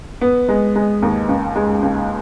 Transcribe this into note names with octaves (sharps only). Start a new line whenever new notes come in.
B3
G#3
G#3
D#2
C#2
G#3
C#2